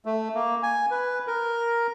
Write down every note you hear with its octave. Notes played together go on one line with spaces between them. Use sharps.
A3
A#3
G#5
B4
A#4